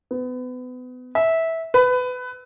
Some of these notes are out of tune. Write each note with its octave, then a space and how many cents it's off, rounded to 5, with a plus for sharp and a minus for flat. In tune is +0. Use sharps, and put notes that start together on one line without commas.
B3 +30
E5 -15
B4 +20